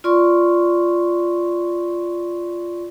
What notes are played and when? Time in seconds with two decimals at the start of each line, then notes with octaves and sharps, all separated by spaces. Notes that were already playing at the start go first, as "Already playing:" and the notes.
0.04 F4 D5 C6 C#6